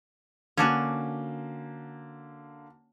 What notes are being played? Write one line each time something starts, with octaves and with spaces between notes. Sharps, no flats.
D3 A#3 C#4 D4 F#4